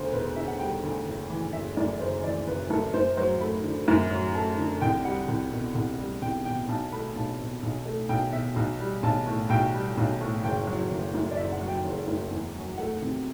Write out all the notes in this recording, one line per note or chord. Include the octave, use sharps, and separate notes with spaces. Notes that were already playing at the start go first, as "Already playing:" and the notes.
Already playing: E1 D2 C5
E1 B4
D3 E5
F#5
G3 G5
D2
F#1
E3
F#1 E5
F#2 D5
F#1 C5
E3 D5
F#1 B4
F#2 A4
F#2 C5
F#3 C5
A3 B5
D3
F#2
F#3
A3 A5
D3
C2 G5
G3 F#5
C2
B2
C2
G3
C2 G5
B2 G5
B1 A5
A3 B5
B1 A5
B2
B1
A3
B1 G5
B2 E5
B1
G3
B1 A5
A2
B1 G5
G3
B1
A2
F#1 G5
F#3
F#1
F#2
D5
F#1 E5
F#5
F#3
G5
F#1
F#2
E2
F#3
A3 F#5
C3